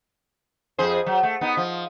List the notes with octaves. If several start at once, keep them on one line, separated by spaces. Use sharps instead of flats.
F2 G#4 C5
F#3
A3
B3 D#4
F3